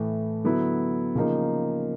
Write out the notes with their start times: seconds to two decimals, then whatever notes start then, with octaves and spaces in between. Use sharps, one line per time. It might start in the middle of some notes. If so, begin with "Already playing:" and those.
Already playing: A2 E3 A3
0.44 D3 F#3 B3 E4
1.15 C#3 F3 A#3 D#4